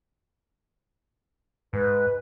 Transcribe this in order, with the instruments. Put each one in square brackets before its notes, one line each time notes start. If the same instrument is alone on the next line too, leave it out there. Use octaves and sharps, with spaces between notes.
[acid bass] G#2 [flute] B4